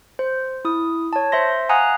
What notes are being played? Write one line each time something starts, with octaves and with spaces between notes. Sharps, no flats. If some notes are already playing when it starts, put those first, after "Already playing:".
C5
E4 D#6
C#5 A5
C5 E5 C6 A#6
F5 F#5 G#5 A#5 D#6 F#6